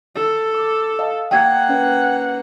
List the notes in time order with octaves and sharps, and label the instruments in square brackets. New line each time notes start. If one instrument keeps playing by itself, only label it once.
[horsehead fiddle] A4
[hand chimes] D6
D#5 F5 A5
[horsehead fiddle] A#3 F#5 [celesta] G5 G#6
[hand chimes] C#4 B4